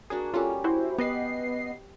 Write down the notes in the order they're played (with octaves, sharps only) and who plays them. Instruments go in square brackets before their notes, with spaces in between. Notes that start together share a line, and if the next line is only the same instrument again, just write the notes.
[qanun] A#3 D4 F#4 [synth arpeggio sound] G#4
[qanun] G3 C#4 G4 [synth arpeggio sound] F4 A4
[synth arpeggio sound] E4 F#4 C5
[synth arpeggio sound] B3 D#5 C7 [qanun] G4 B4